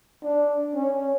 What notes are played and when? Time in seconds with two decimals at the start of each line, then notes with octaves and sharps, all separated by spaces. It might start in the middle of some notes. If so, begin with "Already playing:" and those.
0.23 D4
0.75 C#4